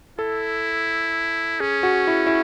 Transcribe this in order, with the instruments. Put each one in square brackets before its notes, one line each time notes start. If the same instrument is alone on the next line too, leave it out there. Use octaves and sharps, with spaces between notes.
[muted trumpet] E4 [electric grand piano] A4
[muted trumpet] C#4 [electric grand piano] G#4
[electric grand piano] F#4
E4
E4